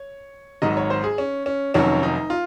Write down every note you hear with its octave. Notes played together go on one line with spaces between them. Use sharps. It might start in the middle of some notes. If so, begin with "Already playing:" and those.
Already playing: C#5
G#1 G#2 D#3 F#3 D#5
C#5
C5
G#4
C#4
C#4
F1 F2 D#3 F#3 C#4
D#4
F4